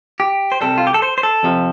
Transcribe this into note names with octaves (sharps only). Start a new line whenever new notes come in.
G4
C5
C2 C3 G3 A4
F4
G4
A4
C5
C5
A4
F2 C3 F3